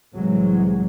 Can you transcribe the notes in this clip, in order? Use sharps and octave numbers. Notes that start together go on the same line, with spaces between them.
C2 A2 C3 E3 F#3 G#3